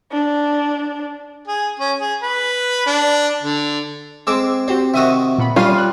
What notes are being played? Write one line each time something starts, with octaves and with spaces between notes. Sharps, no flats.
D4
G#4
C#4
G#4
B4
D4
D3
G#3 C4 G#4 D6 E6
C4 F#4 G4 C5
C3 D#3 F#4 E5 D#6 E6
A#2 B3 B5
G3 C#4 F4 F5 D#7
F#6